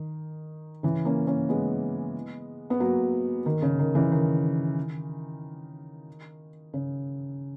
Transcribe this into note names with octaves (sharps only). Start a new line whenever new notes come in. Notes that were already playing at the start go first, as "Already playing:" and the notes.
Already playing: D#3
C#3 E3
A#3 C#4
A#3 C#4
G#3 B3
B3
F#3 A#3
D#3
C#3
D#3
C#3 E3
D#3
C#3